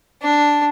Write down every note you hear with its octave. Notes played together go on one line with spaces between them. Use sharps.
D4